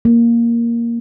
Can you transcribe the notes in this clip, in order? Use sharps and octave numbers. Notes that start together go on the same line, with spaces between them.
A#3